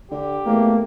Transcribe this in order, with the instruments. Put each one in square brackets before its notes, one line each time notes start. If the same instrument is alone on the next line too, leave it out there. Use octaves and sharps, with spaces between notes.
[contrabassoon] D3 [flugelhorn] G4
[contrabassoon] E2 [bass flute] A3 [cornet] A#3